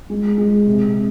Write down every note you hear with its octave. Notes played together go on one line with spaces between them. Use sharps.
G#3
G#3
C3
C3